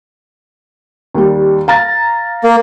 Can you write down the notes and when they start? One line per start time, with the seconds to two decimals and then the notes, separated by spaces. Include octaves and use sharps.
1.14 D#2 G3
1.68 F5 A#5 A6
2.44 A#3